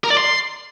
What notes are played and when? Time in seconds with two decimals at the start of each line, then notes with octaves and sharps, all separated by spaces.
0.04 A#4
0.10 D5
0.17 C6